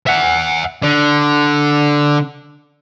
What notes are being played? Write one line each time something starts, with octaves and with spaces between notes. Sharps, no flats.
E5 F#5
D3